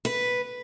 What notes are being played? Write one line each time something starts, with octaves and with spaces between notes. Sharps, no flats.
B4